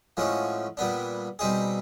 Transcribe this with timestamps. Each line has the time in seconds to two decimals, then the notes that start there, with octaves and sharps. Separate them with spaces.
0.17 A2 F3 G#3 C#4 F#4
0.77 A#2 G3 B3 D4
1.39 B2 G3 C4 D#4 G#4